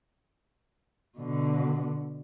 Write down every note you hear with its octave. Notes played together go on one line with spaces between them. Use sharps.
B2 D3